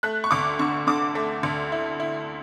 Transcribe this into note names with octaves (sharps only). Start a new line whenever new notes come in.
A3 F#6
C#6
D2 D6
D3 C#6
D3 D6
A3
D2
E4
E4